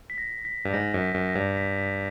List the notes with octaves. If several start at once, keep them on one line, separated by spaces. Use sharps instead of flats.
B6
A#6
B6
G2
G#2 A#6
F#2
B6
F#2
A#6
G2
B6
B6